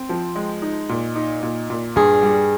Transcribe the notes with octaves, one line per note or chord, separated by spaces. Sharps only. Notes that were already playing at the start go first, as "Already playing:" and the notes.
Already playing: C4
F3
G#3
D#4
A#2
D#4
A#2
A#2
G2 G#4
G3